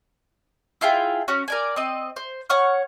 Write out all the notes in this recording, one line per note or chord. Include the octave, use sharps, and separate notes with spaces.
E4 F4 G#4 G5
C#4 F#4
A#4 D5 G#5
C4 D#5
C5
C#5 F#5 C#6 F6